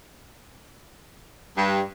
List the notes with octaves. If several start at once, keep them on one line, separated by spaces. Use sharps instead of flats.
G2